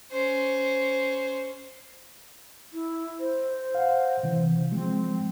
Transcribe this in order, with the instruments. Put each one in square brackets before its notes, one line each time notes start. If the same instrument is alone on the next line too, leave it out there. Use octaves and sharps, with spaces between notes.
[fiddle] C#4 C5
[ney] E4
C5
[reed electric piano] F5 F#5
C3 E3
[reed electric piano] F3 G#3 [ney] C4